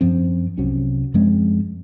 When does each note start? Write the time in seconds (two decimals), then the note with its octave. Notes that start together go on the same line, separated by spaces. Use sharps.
0.01 F#2 F3 C4
0.58 C2 C3 F#3 C#4
1.14 F#2 F3 G#3 C4